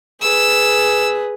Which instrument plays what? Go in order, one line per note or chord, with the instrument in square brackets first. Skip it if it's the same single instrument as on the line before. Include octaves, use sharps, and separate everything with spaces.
[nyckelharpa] G#4 B4 [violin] E6